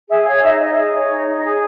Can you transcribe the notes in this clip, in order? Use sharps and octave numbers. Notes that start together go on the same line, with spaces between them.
G#4 E5
C#5 F5
D#4 E5
D#4 D#5
G#4
C#5
D#4
D#4
G#4